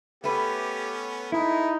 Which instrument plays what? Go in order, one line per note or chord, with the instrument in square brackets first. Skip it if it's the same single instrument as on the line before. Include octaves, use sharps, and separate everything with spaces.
[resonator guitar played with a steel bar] A3 B4 [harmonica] B3 C#4 [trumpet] G4
[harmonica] G#3 [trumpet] D#4 [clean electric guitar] E4